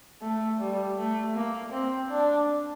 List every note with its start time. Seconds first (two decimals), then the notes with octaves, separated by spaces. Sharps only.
0.22 A3
0.60 G3
0.98 A3
1.35 A#3
1.72 C4
2.09 D4